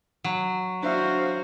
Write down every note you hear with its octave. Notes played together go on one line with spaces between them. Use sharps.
F#3
D4 F#4 C5 E5 F5